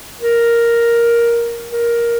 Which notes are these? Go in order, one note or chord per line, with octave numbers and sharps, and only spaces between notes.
A#4
A#4